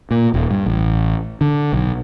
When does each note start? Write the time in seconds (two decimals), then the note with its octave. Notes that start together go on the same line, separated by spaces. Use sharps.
0.11 A#2
0.34 D#1
0.51 G2
0.66 A1
1.41 D3
1.73 B1